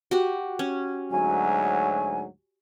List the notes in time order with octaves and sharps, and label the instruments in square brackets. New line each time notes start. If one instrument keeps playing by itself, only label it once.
[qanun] F#4 G4 F#5
C#4
[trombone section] D2 G#2 F#3 [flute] G#5